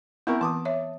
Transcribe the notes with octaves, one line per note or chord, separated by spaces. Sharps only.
B3 C4 E4 A#4 C#6
E3 A5 D6 D#6
C#5 E5